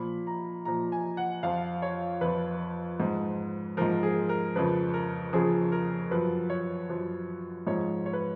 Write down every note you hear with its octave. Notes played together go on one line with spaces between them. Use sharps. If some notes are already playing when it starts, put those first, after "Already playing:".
Already playing: A#2 F3 B5
A#5
A#2 F3 A#5
G#5
F#5
F2 F3 F5
C#5
F2 F3 B4
G#2 F3
G#2 F3 A#4
G#4
A#4
F2 C#3 F3 B4
A#4
F2 C#3 F3 G#4
A#4
F#2 F3 B4
C#5
F#2 F3
G#2 F3 C#5
C#5
B4